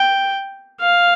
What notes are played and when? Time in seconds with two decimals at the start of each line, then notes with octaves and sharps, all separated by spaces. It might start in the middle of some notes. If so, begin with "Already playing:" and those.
Already playing: G5
0.80 F5